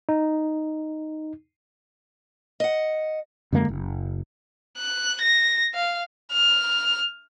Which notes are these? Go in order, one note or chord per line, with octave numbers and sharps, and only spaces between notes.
D#4
D#5 F#5
F#2 D3 G#3 A#3
F#1
F#6
A#6
F5
F6